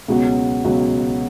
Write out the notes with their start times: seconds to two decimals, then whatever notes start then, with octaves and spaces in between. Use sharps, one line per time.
0.08 C#2 B2 F#3 B3
0.64 C#2 B2 F#3 B3